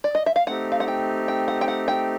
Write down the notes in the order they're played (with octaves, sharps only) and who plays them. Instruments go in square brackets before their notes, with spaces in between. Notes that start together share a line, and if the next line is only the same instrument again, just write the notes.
[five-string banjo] D5
D#5
E5
F5
[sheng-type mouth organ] A3 C4 D#4 G4 [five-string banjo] F#5
[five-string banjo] F5
F#5
G5
G5
F#5
G5
F#5
G5